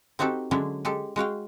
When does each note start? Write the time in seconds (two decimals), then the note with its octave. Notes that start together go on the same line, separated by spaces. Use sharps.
0.19 C4 D#4 F#4 G4 A4
0.51 D3 F#3 G#3 C#4 D4 E4
0.85 G#3 G4 A4
1.16 G#3 F#4 F5 G5